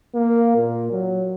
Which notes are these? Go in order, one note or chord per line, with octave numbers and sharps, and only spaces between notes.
A#3
A#2
F#3